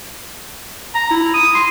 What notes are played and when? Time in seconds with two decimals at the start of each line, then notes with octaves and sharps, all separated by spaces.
0.95 A#5
1.11 E4
1.34 D#6
1.55 C6